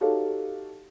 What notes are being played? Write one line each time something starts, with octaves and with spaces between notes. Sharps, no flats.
D#4 F#4 G4 A4 C#5 F5